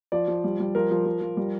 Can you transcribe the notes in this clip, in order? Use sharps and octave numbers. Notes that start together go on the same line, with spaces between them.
F3 D5
F3
G3
G3
F3 A#4
F3
F3
F3
G3